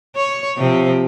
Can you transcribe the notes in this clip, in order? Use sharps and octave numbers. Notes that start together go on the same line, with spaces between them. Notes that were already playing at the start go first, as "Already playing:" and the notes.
C#5
C3 F3 C4